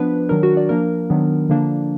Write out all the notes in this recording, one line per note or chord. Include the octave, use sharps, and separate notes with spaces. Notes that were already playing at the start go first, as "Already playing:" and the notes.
Already playing: F3 B3 D4 B4
D#3 F#3 D4 A#4
F#4
D5
F3 A#3 D4 A#4
D#3 F#3 B3 D4
D3 F3 A#3 D4